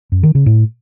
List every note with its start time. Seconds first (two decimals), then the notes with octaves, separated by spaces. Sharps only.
0.12 F#2
0.23 D#3
0.35 C#3
0.46 A2